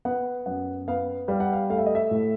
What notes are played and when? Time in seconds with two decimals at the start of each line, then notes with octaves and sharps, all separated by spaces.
0.05 B3 F#5
0.46 F#2 F#5
0.88 B3 F5
1.28 G3 F5
1.40 F#5
1.53 F5
1.70 A3 F5
1.78 E5
1.86 D#5
1.95 E5
2.11 A2